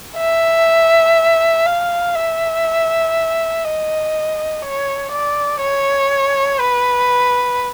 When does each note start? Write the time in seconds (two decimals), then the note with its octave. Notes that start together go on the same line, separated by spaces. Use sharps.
0.17 E5
1.66 F5
2.15 E5
3.64 D#5
4.62 C#5
5.12 D5
5.61 C#5
6.60 B4